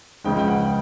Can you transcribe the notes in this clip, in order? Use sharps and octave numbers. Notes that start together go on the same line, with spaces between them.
C#2 C#3 F3 G#3 G5
G5
F#5